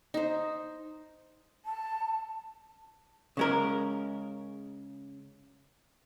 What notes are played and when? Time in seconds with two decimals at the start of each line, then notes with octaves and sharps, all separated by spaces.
0.14 D#4 C5
1.66 A5
3.37 C#3 G#3 A#4